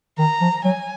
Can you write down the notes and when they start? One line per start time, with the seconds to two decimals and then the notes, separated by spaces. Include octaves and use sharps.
0.18 D#3 A#5
0.41 F3
0.64 F#3 G#5